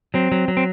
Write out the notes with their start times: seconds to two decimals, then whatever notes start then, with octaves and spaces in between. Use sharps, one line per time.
0.14 F#3 C4
0.32 F#3
0.48 F#3
0.57 C4